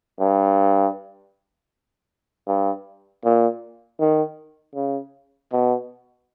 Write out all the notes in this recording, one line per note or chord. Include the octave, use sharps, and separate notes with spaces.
G2
G2
A#2
D#3
C#3
B2